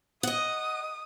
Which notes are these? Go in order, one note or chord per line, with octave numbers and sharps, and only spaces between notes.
D#5 F#5 D#6